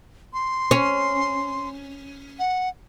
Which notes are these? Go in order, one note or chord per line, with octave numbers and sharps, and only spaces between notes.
C6
C#4
F#5